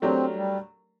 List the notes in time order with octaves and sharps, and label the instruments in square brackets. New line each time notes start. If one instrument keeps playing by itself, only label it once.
[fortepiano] F#3 A3 D4 G4 A#4 [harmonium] C4
[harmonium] G3